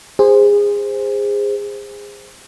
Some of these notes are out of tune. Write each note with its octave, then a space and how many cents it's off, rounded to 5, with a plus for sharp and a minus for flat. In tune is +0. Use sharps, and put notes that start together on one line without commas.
G#4 -25 C5 +0